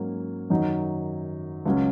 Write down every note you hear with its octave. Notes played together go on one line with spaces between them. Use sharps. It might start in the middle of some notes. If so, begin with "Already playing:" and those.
Already playing: G#2 F#3 A#3 C#4
F#2 D#3 F#3 D#4
C#2 C#3 F#3 C#4